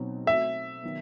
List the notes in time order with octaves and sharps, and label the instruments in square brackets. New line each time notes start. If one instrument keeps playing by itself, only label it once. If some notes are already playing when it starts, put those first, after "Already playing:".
Already playing: [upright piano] B2 F#3 C4 D#4
[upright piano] A3 C4 F#4 [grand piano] E5
[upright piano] D#3 F#3 B3